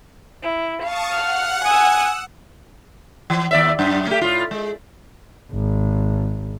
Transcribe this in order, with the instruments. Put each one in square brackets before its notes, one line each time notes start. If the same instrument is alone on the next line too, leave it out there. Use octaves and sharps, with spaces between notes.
[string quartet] E4
[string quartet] F5 [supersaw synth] A5 C#6 D#6
[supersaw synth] F#5 [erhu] F6
[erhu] G#5 [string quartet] D#6 E6
[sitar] E3
D#2 D5 E5
F#2
A3 G4
A2 F4
G#3
[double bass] G#1